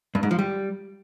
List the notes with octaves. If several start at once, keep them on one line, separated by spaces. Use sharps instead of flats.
G2
G#2
F3
G3